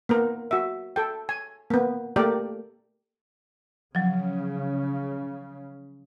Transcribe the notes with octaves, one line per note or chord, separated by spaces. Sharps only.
A#3 B3 A#4
F#4 E5
A4 G5
G#5
A#3 B3
A3 A#3 G4 A#4 D5
C#3 F3 F#3